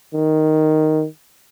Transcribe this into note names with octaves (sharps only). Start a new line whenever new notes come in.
D#3